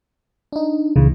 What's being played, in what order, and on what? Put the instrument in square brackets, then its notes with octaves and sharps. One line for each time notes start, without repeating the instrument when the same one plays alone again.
[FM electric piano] D4 D#4
[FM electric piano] C#2 A#2 E3 [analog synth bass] C#3